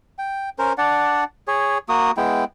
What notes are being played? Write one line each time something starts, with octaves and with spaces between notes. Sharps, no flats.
G5
C#4 A#4 C5
D4 D5 F#5
G#4 C#5
A#3 F#4 D#6
G#3 B3 E4 G5